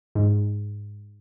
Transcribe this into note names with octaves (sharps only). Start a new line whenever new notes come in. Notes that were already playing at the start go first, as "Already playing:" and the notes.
G#2